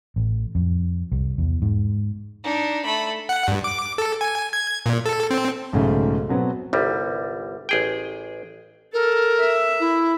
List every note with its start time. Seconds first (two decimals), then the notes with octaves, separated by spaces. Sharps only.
0.16 A1
0.55 F2
1.12 C2
1.38 E2
1.62 G#2
2.44 D4 D#4
2.85 A3 B5
3.29 F#5
3.48 G2
3.64 D6
3.98 A4
4.21 G#5
4.53 G#6
4.86 A#2
5.06 A4
5.31 C4
5.73 B1 G#2 C#3 A3
6.29 B2 F#3 B3 C4
6.73 G1 C2 G3
7.69 A1 G#4 G5
8.94 A4 A#4
9.39 E5
9.80 E4